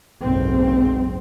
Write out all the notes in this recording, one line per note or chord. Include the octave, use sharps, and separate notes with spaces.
F#1 B1 G#2 C4